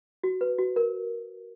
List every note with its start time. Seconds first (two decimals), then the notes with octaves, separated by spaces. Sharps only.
0.23 F#4
0.41 B4
0.58 F#4
0.76 A#4